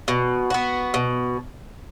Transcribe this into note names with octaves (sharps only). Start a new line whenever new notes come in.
B2
B3 F#4
B2